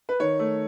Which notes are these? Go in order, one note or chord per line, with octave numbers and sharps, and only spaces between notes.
B4
D#3 C#5
A3